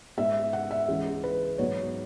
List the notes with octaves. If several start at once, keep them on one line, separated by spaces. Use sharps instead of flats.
G#2 G#3 B3 E5
F#5
E5
C#2 C#3 E3 G#3
B4
G#2 F#3 B3 C#5